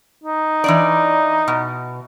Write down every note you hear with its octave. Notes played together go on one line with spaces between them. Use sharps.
D#4
E3 D4 D5
B2